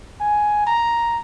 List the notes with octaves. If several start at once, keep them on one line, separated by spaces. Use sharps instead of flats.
G#5
A#5